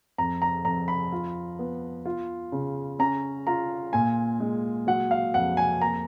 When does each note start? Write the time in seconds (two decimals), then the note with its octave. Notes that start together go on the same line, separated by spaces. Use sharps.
0.18 F2 A#5
0.42 A#5
0.65 F2 A#5
0.88 B5
1.12 F4
1.59 B3
2.05 F4
2.52 C#3
2.99 C#4 A#5
3.47 F4 A#5
3.93 A#2 G#5
4.40 G#3
4.87 F#3 F#5
5.11 F5
5.34 F2 F#5
5.57 G#5
5.81 A#3 A#5